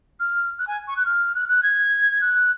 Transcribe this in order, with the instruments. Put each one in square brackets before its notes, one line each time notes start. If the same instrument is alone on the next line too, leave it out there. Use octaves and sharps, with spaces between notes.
[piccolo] F6
F#6
G#5
C#6
F#6
F6
F#6
F#6
G#6
F#6